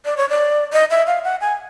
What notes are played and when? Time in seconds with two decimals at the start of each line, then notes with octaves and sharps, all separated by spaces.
0.05 D5
0.17 C#5
0.29 D5
0.73 D#5
0.91 E5
1.07 F5
1.24 F#5
1.41 G#5